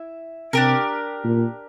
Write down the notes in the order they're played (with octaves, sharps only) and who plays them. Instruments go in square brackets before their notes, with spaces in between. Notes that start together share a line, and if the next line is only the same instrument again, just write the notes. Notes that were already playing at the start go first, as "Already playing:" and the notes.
Already playing: [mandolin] E4 E5
[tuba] C3 [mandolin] D4 G4 A#4
[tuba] A#2